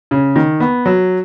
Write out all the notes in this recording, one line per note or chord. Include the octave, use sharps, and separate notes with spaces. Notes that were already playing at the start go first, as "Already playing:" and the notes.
C#3
D#3
B3
F#3